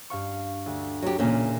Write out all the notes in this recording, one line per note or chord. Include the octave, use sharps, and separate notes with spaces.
G2 F5 C#6
D2
F#3 G4
E1 A#2 C#3 C#4 E7